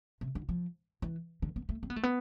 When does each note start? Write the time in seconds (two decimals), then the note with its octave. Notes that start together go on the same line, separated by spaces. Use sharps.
0.21 C3
0.35 D3
0.49 F3
1.02 E3
1.42 D3
1.56 B3
1.69 A3
1.83 C4
1.90 B3
1.96 A3
2.03 B3